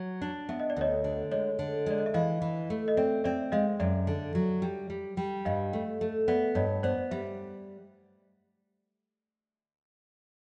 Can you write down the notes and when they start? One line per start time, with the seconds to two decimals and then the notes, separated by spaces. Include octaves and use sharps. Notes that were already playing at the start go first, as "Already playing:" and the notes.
Already playing: F#3
0.22 D4
0.49 B3 E5
0.60 D#5
0.70 D5
0.77 D2 C#5 D#5
1.04 D3
1.31 G#3 C#5 D#5
1.59 D3
1.86 G#3 D5
1.98 D#5
2.06 E5
2.14 E3 D#5 F5
2.42 E3
2.70 A3
2.88 D#5
2.97 C4 D5 E5
3.24 C4 D5 E5
3.52 G#3 D#5 F5
3.80 F#2 D5 E5
4.07 D3
4.35 F#3
4.62 G3
4.90 G3
5.17 G3
5.45 G2 D#5 F5
5.73 A3
6.01 A3
6.28 B3 D5 E5
6.55 G2 C#5 D#5
6.83 B3 C5 D5
7.11 G3 E5